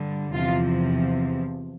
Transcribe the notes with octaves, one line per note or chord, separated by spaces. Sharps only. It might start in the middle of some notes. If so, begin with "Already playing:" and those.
Already playing: G2 D3 G3
E2 C3 F3 F4